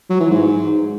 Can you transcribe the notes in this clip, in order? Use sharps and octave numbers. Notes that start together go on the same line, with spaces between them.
F#3
E3
G#2